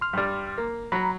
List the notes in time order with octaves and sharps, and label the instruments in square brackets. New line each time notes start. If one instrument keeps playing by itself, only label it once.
[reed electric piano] C6 F6
[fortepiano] G2 G3
A#3
[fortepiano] F#3 [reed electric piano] A#5 B5